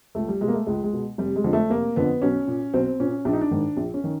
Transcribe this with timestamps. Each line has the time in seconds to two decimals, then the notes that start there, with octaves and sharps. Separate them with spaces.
0.15 C#2 A3
0.28 G3
0.41 B2 G#3
0.48 A#3
0.54 A3
0.67 C#2 G#3
0.84 G#3
0.93 B2
1.18 F1 G3
1.36 G#3
1.44 F2 D3
1.53 A3
1.70 F1 A#3
1.96 F2 D3 B3
2.22 B1 C#4
2.48 A#2
2.73 B1 C4
3.00 A#2 C#4
3.25 A#1 D4
3.33 D#4
3.41 D4
3.51 G#2 D#3
3.77 A#1
3.94 C#4
4.04 D#3